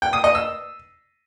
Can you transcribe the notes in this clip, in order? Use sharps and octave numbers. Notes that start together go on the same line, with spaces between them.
G5
D#6
D#5
E6